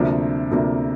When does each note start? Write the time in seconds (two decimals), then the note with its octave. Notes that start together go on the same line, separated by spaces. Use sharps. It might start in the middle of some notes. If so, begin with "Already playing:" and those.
Already playing: D2 C3 F3 A#3 D4
0.51 D2 C3 F3 A#3 D4